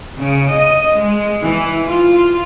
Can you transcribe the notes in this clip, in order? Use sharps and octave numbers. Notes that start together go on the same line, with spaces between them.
C#3
D#5
G#3
E3
F4